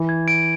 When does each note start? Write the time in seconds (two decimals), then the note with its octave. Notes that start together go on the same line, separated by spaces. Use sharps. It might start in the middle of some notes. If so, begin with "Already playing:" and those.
Already playing: E3
0.09 G#6
0.28 D7